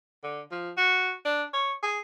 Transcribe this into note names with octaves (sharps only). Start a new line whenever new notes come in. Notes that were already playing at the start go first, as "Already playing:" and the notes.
D3
F3
F#4
D4
C#5
G#4